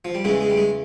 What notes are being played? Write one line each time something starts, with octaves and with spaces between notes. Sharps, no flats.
F3
G3
E2 C#3 E3 G#3
G#3
G3
G#3